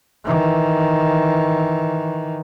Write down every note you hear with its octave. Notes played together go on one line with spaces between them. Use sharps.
D#3 E3